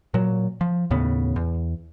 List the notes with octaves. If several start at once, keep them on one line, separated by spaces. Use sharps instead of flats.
A#2 F#3
F3
D#2 A2 C#3 B3
E2